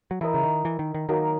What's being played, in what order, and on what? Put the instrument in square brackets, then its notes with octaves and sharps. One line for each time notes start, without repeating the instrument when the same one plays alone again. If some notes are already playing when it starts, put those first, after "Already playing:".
[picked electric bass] F#3
[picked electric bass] E3 [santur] E4 A#4 D#5
[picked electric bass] C#3
D#3
E3
D#3
D#3
[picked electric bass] D#3 [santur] F#3 A#3 D#4 A#4